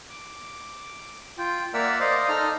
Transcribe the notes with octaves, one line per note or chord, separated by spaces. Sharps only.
D6
F4 G5
A#3 A#4 D5 E5 F#5 E6
C5 D5 D#5 F5
D#4 A4 A#5 F6